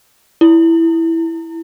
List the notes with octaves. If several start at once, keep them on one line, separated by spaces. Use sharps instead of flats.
E4